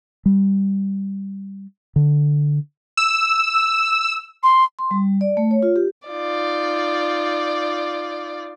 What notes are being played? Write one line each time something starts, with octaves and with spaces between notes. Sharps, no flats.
G3
D3
E6
C6
C6
G3
D5
A3
C#5
F4
G4
D#4 F4 D5